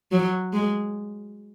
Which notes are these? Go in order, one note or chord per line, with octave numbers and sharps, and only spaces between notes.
F#3
G#3